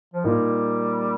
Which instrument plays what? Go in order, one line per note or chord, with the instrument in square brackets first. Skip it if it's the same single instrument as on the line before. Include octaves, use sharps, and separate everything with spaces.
[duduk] F3
[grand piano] A#2 A#3 D#4 [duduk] G3